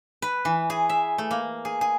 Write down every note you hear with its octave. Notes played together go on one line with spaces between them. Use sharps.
B4
E3
G#4
E5
A3
A#3
G#4
G#4